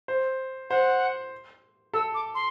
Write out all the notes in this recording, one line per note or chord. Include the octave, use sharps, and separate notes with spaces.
C5
C5 F#5
A4 E6
D6
C6